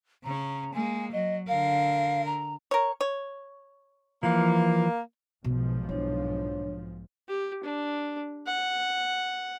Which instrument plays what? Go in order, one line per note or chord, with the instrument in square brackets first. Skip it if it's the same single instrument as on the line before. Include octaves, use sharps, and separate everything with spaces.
[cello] C#3 C#4 [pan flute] A#5
[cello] G#3 A#3 [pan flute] G#5
[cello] F#3 [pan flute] D#5
[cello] D3 A#4 [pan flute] F5
[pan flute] A#5
[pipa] A#4 C#5
C#5
[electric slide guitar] E3 F3 [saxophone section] A#3
[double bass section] B1 G#2 F3 [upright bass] B2
[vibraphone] D4 C#5 [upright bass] E4
[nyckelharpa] G4
D4
F#5